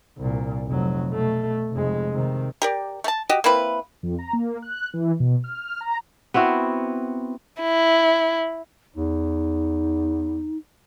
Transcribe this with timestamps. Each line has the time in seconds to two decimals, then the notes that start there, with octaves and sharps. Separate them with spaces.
0.17 C2 A#2
0.67 F1 F#3
1.10 B2 A3
1.73 F1 G#3
2.13 C3 D#3
2.62 G4 A#4 D5
3.04 A3 A5
3.29 F#4 G4 D#5
3.44 A#3 C4 E4 B4
4.03 F2
4.19 A#5
4.33 A#3
4.62 F#6
4.94 E3
5.20 B2
5.44 F6
5.81 A#5
6.34 B3 C4 E4 F#4
7.61 E4
8.96 E2 D#4